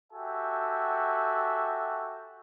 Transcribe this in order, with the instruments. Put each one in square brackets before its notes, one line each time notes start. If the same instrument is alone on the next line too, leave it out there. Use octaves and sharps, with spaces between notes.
[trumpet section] F#4 G4 A4 E5 G5 G#5